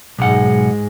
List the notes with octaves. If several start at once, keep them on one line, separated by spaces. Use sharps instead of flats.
B1 G#2 G#3 F#5